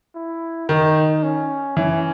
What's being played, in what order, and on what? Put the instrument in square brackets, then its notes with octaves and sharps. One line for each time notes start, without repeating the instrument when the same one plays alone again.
[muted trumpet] E4
[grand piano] D#3 [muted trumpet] D#4
[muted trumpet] C#4
[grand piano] E3 [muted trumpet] C#4